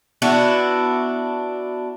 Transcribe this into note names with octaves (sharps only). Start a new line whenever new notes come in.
B3 D4 E4 F#4